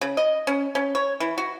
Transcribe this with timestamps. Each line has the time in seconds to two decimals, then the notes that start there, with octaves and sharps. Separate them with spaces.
0.01 C#3
0.17 D#5
0.47 C#4
0.75 C#4
0.95 C#5
1.20 E3
1.38 F#4